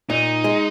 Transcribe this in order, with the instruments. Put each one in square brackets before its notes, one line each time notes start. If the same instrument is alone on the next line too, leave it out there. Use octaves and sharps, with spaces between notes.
[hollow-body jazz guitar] A#2 [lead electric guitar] D#4
[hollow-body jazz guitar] G#3